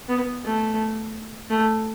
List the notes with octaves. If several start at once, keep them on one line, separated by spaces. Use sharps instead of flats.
B3
A3
A3